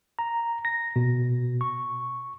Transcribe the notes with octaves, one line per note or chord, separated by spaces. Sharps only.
A#5
A#6
B2
C#6